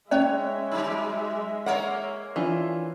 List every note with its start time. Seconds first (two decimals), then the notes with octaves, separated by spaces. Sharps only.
0.11 G#3 C#4 C#5 D5 E5
0.72 F#3 D#4
1.66 A#3 A#4 C#5 F#5
2.36 E3 D4 F4